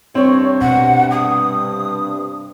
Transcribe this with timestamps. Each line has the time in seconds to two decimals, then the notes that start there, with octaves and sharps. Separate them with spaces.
0.15 G2 C3 C4 C#5
0.61 B2 F#5
1.11 D#6